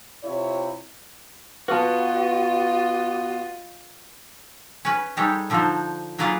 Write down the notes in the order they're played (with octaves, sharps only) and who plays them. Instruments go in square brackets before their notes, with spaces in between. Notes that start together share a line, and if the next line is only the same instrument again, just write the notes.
[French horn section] C3 E4 F4 C#5
[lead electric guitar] B3 F#4 [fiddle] F4 D#5 [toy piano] B4 A5
[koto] C#4 B4
G3 G#3 D#4 G4 A4 C#5
D3 F3 D4 D#4 F#4 C5
F#3 A#3 F4 G#4 B4 F#5